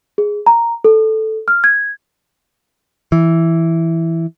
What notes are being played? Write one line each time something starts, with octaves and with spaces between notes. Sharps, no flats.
G#4
A#5
A4
F6
G#6
E3